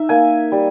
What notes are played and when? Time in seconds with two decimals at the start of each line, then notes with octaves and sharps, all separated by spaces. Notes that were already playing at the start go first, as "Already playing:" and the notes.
Already playing: D#4 E5
0.09 A#3 G#5
0.52 G3